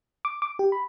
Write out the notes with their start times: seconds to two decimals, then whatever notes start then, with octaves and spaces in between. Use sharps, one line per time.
0.25 D6
0.42 D6
0.59 G4
0.72 B5